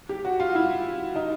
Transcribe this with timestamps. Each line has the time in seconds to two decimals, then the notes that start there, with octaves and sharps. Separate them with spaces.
0.09 G4
0.25 F#4
0.40 F4
0.55 E4
1.16 D#4